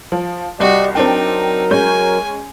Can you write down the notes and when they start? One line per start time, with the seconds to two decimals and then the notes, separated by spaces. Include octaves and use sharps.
0.12 F3
0.60 C2 F#4 G4 D5 D#5
0.95 F#3 C4 D4 D#4 A#4 G5
1.71 G#3 C#4 G#5 G6